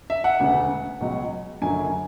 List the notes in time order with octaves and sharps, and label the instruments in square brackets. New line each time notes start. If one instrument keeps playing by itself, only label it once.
[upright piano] E5
F#5
E1 D2 C#3
C#2 B2 F#3
F#1 F#2 D3 F#3 G#5